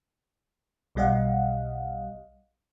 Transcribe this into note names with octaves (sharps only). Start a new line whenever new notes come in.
B1 B2 G3 D#5 F5 F#5